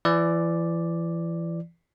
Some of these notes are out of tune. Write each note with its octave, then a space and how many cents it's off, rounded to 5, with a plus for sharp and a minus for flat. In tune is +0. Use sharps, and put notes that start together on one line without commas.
E3 +30 D5 +0